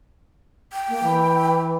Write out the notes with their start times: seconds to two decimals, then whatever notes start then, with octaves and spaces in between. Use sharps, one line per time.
0.73 G5
0.89 A#3
1.03 E3